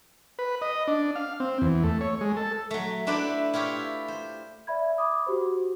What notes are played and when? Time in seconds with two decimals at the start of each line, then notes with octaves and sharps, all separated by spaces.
0.39 B4
0.62 D#5
0.88 D4
1.16 F5
1.40 C4
1.61 E2
1.83 A3
2.01 C#5
2.21 G#3
2.37 A4
2.71 F#3 A3
3.07 A3 D4 E4 B4 C5 D5
3.53 E4 F4 G4 C#5
4.08 C5
4.67 D5 E5 B5 G#6
4.98 B5 D6 D#6
5.27 F#4 G4 C5